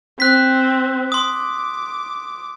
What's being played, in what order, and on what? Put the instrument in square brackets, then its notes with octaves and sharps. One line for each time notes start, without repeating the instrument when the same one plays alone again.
[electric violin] C4 [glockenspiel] F#6 B6
[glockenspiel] C6 D#6 [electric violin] D6